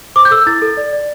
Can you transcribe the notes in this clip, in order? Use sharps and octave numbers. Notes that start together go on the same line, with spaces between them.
C5 D6
G6
A4 E6
E4 A6
A4
D5
D5